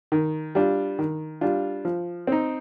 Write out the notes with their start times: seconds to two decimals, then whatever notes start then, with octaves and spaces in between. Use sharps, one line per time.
0.12 D#3
0.55 G3 D4 F4
0.99 D#3
1.41 G3 D4 F4
1.85 F3
2.27 C4 D#4